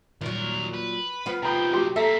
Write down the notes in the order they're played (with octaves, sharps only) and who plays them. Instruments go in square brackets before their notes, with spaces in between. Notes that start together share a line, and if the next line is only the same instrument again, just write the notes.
[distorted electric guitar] D#2 A#4 [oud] A#2 F#3
[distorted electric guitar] B4
[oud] F3 B3
[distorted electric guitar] C3 D#3 [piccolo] G5 [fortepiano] A#5 B5
[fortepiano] F#3 G4 C6
[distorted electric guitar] A#3 C4 [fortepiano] A4 A#5 [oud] E5 [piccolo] B6